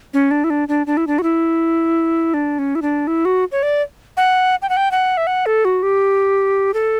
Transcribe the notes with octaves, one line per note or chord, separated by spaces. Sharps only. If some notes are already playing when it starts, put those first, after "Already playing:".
C#4
D4
E4
D4
D4
D4
E4
D4
F#4
E4
D4
C#4
E4
D4
E4
F#4
C#5
D5
F#5
G5
F#5
G5
F#5
E5
F#5
A4
F#4
G4
A4